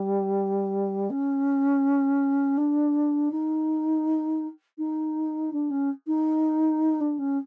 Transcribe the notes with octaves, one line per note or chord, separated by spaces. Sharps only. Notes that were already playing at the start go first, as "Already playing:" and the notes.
Already playing: G3
C#4
D4
D#4
D#4
D4
C#4
D#4
D4
C#4